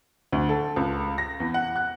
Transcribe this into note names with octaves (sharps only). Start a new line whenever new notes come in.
D2
A4
C#2
A#6
E2
F#5
F#6